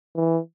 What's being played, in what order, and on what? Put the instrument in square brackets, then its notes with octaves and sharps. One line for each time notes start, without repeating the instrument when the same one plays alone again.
[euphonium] E3